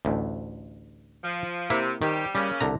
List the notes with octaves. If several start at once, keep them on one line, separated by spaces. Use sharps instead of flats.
A1 D2
F3
C3 A#3 E4 E5
D#3 G3 C4 G4
C#3 G3 A#3 C#4
C2 D3 A#5